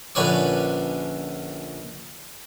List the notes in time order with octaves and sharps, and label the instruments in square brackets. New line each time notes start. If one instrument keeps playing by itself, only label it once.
[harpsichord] A#1 D3 C#4 B4 C#5 D5